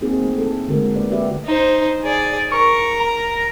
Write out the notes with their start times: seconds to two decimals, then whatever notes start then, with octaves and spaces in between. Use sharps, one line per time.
0.01 A#3 C4 D#4 F#4 G#4
0.22 A3
0.37 A3 E4 A4
0.68 D3 G#3 A3 F#4 A#4
0.96 A3 A#3 B4 D5
1.11 F#4 G4 B4 D5 E5
1.46 D#4 C5
2.02 G#4 D5
2.52 A#4 C#6
3.00 A#5